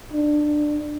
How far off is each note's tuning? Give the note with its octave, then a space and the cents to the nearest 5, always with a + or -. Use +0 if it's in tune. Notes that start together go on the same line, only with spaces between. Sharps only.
D4 +20